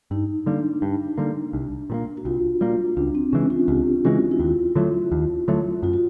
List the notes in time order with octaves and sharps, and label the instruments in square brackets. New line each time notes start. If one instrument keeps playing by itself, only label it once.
[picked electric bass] G2 [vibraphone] D#4
[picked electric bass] D3 G3 A#3 [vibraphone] D4
[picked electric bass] G2
D3 G3 A#3
C2
A#2 G3 A#3
[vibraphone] F#4
[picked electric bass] C2 [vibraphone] F4
[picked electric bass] A#2 G3 A#3 [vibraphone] F4
[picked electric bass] C#2 [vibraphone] D4
[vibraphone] C4
[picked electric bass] C#3 E3 G#3 [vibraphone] C#4
[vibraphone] F4
[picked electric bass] C#2 [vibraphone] F4 G4
[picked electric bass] C#3 E3 G#3 [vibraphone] E4 F#4
[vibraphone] E4
[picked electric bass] D#2 [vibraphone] F4
[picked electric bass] D3 F#3 A3
D#2
D3 F#3 A3
[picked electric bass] F#2 [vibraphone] F4
[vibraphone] F#4